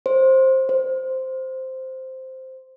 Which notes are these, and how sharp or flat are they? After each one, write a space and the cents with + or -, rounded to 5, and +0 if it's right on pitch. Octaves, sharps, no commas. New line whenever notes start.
C5 +10
C5 -5